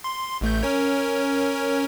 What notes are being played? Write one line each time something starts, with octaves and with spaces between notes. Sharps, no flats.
C6
A1 A3 G6
C#4 A#4 C#5